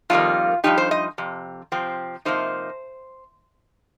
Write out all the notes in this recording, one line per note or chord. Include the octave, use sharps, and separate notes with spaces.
F2 D#3 G3 A#3 F4
G2 F3 D#4 G4
C5
D#5
F2 C3
C3 F3 C4
C3 F3 A#3 D#4 C5